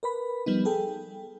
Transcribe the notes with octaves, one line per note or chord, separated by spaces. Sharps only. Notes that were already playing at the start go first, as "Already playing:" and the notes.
A#4 B4 B5
F3 G3 B3 D#4
G#4 A4 G5